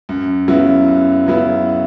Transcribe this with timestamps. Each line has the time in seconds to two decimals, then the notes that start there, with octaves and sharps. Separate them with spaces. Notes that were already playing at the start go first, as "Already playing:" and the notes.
0.09 F#2
0.48 C#3 F#3 B3 E4
0.88 F#2
1.26 C#3 F#3 B3 E4